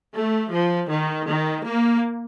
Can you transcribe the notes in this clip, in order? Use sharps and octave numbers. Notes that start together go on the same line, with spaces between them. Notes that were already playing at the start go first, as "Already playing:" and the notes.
A3
F3
D#3
D#3
A#3